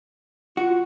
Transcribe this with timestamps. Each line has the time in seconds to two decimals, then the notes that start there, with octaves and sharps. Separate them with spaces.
0.57 F4 F#4